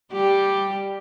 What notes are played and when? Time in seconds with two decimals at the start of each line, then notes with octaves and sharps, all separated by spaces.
0.13 G3 G4